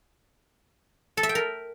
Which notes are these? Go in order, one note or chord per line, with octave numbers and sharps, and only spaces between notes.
A4
E5
G5
A#4